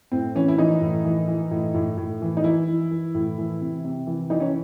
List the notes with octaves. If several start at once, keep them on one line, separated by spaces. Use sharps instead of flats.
A2 C4
E3 C#4
E4
E3 D#4
A2
E3
E3
A2
A2
A2
E3
D#4
E3 E4
E3
E3
A2
E3
C3
C3
E3
E3 D#4
C#4